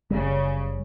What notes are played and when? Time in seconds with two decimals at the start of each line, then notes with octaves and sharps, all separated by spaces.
0.10 F#1 C#3 G3